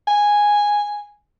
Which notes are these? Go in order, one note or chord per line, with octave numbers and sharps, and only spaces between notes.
G#5